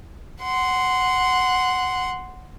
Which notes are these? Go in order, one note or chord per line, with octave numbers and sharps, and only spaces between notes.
F#5 C6